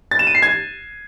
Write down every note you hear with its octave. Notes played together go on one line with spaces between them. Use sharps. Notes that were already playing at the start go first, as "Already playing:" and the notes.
A6
E7
D#7
C7
G#6